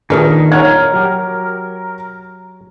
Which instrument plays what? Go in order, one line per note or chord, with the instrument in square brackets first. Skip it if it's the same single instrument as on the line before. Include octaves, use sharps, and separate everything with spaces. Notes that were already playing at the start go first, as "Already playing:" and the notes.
[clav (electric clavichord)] A#2 D4 [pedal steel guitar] D#3 [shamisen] G#4 A#4 B4
[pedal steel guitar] A#4 [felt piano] C#5 F6 G#6 [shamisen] F#5
[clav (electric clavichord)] F#3 G4